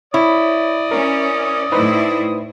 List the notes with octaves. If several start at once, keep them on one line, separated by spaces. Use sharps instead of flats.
E4 C#5 D5 D#6
C#4 A#4
A2 A3 D#4 E4 B4 C5